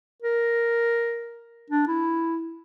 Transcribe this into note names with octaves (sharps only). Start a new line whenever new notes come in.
A#4
D4
E4